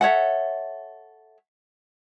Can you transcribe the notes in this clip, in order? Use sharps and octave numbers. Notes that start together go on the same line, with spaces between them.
A4 C#5 E5 F#5